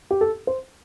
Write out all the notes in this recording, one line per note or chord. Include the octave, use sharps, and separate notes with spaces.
G4
A4
C5